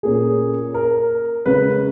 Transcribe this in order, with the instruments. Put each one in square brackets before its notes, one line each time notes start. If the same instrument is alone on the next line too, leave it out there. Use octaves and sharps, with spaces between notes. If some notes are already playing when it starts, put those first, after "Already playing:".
[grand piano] A#2 A#3 C#4 G#4
A#4
C#3 G#3 C#4 B4